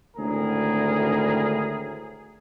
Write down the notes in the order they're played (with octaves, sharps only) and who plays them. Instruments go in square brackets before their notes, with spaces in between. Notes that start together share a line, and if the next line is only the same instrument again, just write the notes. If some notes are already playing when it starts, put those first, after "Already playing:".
[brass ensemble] G#1 D2 A2 G#4 A#4